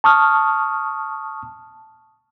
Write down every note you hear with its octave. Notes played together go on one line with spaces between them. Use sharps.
A5 C#6 D#6 F6